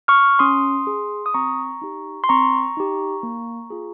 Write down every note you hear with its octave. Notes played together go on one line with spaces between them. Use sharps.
C#6 F6
C#4 C6 D#6
G#4
D#6
C4 A#5 C#6
D#4 G4
C6
C4 A#5 C#6
D#4 G4
A#3
F4 G#4